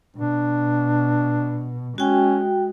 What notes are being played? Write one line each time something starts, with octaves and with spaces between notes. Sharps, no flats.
B2 D4
G#3 C#4 F#4 G5